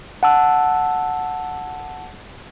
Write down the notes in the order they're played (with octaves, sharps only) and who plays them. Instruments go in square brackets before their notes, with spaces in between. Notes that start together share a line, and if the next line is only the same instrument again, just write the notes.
[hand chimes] F#5 A5 E6